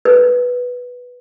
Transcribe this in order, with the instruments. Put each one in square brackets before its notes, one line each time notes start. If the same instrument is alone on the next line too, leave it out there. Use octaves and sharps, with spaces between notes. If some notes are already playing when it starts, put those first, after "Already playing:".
[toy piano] B4